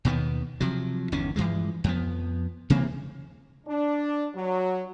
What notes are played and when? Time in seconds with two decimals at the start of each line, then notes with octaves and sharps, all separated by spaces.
0.05 D#2 B2 D#3 B3
0.60 C3 F3 F#3
1.12 G1 E2 D#3 C#4
1.36 G2 E3 F3 G#3
1.84 F2 F3 B3
2.70 C3 E3 A#3 C4
3.67 D4
4.35 F#3